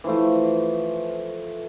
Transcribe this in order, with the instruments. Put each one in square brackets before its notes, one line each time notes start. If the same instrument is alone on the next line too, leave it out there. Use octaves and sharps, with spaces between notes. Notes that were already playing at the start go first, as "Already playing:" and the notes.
[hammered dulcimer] E3 F3 A3